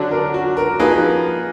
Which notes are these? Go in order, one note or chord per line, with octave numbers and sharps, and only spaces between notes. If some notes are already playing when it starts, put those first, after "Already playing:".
Already playing: D3 F#3 D4
A#4
F#4
A#4
F3 A#3 D#4 G#4 B4